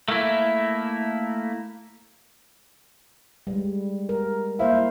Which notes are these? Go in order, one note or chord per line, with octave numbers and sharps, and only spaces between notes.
A3 A#3 E4
G3 G#3
A#4
A#3 E4 C5 F5